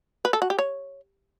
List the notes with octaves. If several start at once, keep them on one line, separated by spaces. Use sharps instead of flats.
B4
A4
F#4
G4
C#5